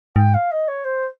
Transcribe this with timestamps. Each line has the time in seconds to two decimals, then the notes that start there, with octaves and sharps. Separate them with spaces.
0.16 G#2 G5
0.34 F5
0.51 D#5
0.67 C#5
0.84 C5